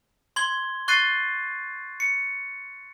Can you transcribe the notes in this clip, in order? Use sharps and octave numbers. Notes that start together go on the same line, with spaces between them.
C6 G#6 G7
C#6 F#6 A6 C7 D#7
C#7